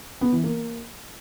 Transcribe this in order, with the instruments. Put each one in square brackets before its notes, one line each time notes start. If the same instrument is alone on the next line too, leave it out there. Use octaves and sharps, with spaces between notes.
[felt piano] B3
E3
A#3